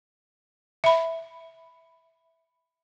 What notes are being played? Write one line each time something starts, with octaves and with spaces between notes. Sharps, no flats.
E5 B5